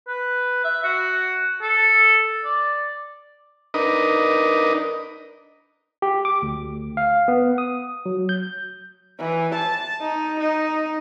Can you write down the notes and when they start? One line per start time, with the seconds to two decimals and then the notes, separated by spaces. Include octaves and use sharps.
0.08 B4
0.64 E5
0.84 F#4
1.62 A4
2.44 D5
3.74 D4 D#4 A#4 B4 D#5
6.02 G4
6.25 D6
6.42 D2
6.97 F5
7.28 B3
7.58 D#6
8.06 F#3
8.29 G6
9.19 E3
9.55 A5
10.01 D#4
10.40 D#4